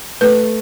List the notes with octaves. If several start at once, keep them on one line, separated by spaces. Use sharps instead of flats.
A3 B4